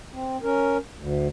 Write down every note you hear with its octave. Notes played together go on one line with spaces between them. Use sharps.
C4
C#4 A#4
D2